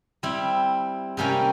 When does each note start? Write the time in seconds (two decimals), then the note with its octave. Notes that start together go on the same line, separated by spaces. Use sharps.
0.23 G3 C4 E4
1.17 C3 G3 A#3 C#4